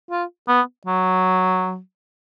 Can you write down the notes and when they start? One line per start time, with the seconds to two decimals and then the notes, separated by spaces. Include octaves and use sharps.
0.10 F4
0.48 B3
0.86 F#3